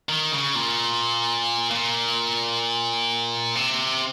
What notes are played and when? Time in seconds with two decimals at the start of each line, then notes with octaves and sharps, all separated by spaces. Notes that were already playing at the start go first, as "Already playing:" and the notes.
0.09 D#3
0.32 C#3
0.55 A#2
1.71 A#2
3.55 C3